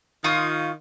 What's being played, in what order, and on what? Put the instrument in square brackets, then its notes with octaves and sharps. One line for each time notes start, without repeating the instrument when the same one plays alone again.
[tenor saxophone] D#3 [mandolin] F4 C#6 D#6